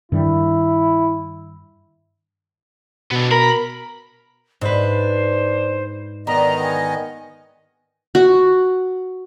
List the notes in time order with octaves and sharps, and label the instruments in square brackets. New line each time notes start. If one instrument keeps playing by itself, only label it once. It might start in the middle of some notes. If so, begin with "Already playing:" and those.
[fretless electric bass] G2 D#3 G3 [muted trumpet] E4
[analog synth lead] B2 [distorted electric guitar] B3 D4
[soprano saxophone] A#4 [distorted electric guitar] B5
[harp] G#2 B4 [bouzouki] D4 [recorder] C5
[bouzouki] D3 G4 A#4 [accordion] D#3 B3 D#5 [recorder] A#5
[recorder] G#5
[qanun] F#4